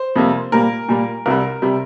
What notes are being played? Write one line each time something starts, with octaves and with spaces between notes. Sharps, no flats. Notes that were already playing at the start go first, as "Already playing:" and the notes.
Already playing: C5
F2 C3 G3 A#3
A#2 G3 A#3 A#4
A#2 G3 A#3
C2 C3 G3 A#4
C3 G3